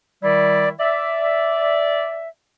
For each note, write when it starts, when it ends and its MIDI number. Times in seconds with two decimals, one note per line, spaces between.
0.23 0.69 51
0.23 0.69 55
0.23 0.69 64
0.23 0.69 74
0.80 2.29 74
0.80 2.29 76